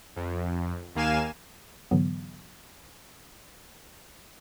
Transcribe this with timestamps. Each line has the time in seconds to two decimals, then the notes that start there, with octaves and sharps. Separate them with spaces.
0.16 F2
0.95 D#2 A#3 F5 G#5 E7
1.91 G#2 D3 E3 F#3 B3